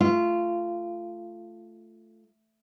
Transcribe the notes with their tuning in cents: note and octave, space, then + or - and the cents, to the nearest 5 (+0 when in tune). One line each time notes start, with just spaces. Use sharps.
A3 +0 F4 -15